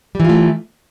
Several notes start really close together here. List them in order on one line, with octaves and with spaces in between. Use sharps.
G3 E3 F4 A3